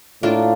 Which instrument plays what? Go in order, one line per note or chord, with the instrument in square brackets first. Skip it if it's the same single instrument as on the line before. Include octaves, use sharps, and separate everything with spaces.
[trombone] A2 [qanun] A#3 D4 F4